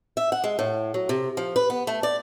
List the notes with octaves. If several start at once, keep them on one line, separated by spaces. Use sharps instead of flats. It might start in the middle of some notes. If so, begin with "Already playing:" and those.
E5
F#5
G#3
A2
F#3
C3
F3
B4
B3
A3
D5